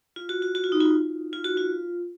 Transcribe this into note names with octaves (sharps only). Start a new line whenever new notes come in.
F4
F#4
F#4
F#4
F4
D#4
F4
F4
F#4
F4